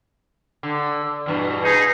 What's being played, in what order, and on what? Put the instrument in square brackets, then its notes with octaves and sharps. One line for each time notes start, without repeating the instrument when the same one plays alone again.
[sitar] D3
E2 G2 B2
[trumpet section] D#4 G#4